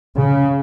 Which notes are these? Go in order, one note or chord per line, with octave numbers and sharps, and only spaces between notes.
C#3